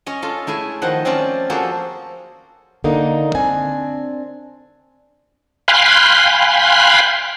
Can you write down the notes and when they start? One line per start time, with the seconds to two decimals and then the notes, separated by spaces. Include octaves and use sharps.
0.06 C#4 C#5 D#5
0.22 C#4 F4 A4
0.47 A3 E4 G#4 G#5
0.82 D#3 F3 C5 D#5 F#5
1.05 C4 C#4 F4 D5 A5
1.50 F3 A#3 F#4 G#4 A4 C5
2.84 D3 A#3 D#4
3.35 C4 D4 G#5
5.68 F5 G5 G#5 B5 C6 F#6